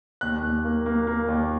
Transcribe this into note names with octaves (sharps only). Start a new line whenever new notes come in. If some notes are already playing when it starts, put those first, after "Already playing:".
D#2 F#6
D#2
A#3
A#3
A#3
D#2